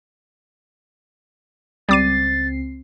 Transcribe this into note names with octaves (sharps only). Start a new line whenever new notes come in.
C#2 G3 C4 D6 A6 C7 D#7